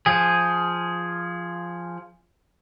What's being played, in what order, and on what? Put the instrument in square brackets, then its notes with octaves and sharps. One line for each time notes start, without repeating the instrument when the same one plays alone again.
[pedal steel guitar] F3 G#4